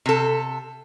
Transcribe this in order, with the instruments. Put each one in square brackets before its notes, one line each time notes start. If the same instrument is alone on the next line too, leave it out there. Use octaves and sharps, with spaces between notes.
[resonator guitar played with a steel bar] C3 A4